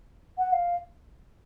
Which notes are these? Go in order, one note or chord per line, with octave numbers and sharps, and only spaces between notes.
F#5
F5